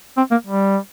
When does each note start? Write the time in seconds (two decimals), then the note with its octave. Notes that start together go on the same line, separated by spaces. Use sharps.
0.17 C4
0.31 A#3
0.46 G3